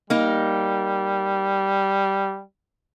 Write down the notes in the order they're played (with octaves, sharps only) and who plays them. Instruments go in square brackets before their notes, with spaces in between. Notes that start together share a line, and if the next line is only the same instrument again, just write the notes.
[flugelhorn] G3 [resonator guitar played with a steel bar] A#3 D#4